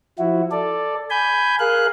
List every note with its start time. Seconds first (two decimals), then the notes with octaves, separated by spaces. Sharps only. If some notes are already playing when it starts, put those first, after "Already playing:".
0.19 F3 E4 F#4
0.51 A4 D5
1.10 G#5 B5 G6
1.59 G#4 A#4 F5 F#6